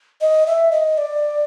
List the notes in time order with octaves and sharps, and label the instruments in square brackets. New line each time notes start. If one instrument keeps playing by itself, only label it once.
[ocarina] D#5
E5
D#5
D5